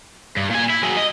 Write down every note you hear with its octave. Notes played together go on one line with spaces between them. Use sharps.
G2
A#2 G#5
E4
F#3 G#4
D#5